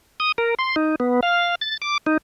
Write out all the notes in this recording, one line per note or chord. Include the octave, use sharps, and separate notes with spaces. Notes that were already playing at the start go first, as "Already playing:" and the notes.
D#6
A#4
C6
D#4
B3
F5
A6
D6
D#4